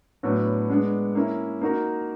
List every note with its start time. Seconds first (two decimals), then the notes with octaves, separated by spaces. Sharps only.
0.23 A2 F#3 B3 D4
0.70 G#3 B3 D4
1.15 A#3 C#4 E4
1.61 A#3 D#4 F#4 A#4